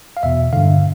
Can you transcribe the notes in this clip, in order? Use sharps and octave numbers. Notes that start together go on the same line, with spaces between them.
F5
E2 B2 E5
G2 D3 F5